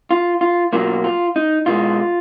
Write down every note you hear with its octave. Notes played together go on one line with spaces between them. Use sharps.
F4
F4
B2 F#3 A#3 F4
F4
D#4
B2 G#3 F4